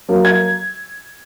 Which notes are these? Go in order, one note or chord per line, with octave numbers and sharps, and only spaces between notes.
F#3 A#3
G#6